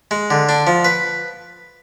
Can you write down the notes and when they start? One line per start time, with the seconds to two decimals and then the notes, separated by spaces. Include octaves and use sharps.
0.11 G#3
0.30 D3
0.49 D4
0.67 F3
0.85 B4